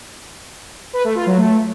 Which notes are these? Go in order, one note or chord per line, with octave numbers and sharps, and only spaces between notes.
B4
A3
F4
F#3
A3